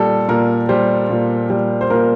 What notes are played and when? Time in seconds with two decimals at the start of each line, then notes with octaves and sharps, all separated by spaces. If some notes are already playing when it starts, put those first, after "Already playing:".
Already playing: A#2 G3 A4
0.28 A#2 A#4
0.69 G3 C5
1.10 A#2
1.50 G3
1.81 C5
1.90 A#2 A#4